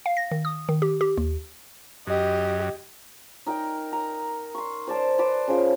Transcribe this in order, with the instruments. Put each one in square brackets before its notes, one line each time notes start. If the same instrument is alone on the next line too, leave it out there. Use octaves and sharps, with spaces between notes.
[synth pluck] F5
A#6
D#3
D#6
D#3
G4
G4
D#2
[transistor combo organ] F#2 [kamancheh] G4 D#5
[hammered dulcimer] D#4 A#4 D#5 G5
A#5
C6 C#6
C5 D5 A5 D6
B4 C5 D5 A5
C#3 F3